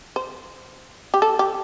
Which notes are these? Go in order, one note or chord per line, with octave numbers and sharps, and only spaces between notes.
C5
G4
A4
G4